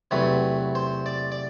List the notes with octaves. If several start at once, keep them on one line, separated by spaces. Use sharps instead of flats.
E2 C3 F#3 A3 B4
C5
D5
D5